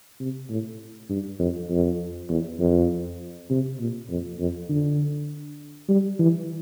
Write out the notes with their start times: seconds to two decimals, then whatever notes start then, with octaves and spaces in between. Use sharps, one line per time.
0.20 C3
0.49 A2
1.10 G2
1.39 F2
1.70 F2
2.29 E2
2.59 F2
3.50 C3
3.79 A#2
4.10 F2
4.39 F2
4.69 D3
5.88 G3
6.19 E3